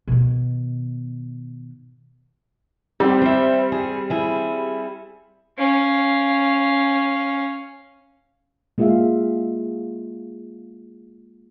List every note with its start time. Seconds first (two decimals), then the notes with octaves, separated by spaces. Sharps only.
0.08 B2 D#3
3.00 G3 C4 G4
3.22 C5 E5
3.72 G#4
4.10 E4 G#4
5.58 C#4 F5
8.78 G#3 A#3 F4 G#4 E5 F5